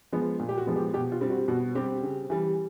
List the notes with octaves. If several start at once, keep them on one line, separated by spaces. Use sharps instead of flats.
F3 G#3 B3
A#2
G4
F#4
F3 G#3 B3
G4
B2 G4
F4
G3 C4
F#4
B2 F#4
G3 C4 G4
C#3
E3 G3